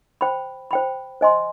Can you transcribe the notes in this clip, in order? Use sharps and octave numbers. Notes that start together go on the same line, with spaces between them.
C5 G5 B5
C5 G5 B5
C5 D#5 G#5 C6